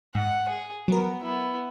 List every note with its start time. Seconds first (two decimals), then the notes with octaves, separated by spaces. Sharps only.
0.15 G#2 F#5
0.48 G#4
0.88 F#3 B3 A#4
1.22 B3 E4